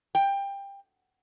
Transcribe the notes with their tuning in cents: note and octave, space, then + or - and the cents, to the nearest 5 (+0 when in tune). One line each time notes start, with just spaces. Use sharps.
G5 +20